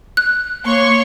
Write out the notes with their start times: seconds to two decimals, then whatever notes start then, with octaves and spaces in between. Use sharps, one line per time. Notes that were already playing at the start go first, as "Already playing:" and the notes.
0.17 F#6
0.65 A#3 C#5 C6 C#6